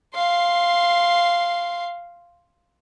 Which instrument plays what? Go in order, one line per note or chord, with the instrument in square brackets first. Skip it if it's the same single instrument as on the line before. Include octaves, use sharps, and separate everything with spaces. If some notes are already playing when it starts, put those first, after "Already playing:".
[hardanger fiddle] F5 C6